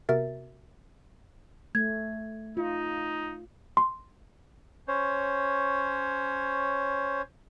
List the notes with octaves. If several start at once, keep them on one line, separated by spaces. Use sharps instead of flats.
C3 B3 F#4 A#4 E5 A6
A3 G#6
D#4 F4
C6
C#4 C5 C#5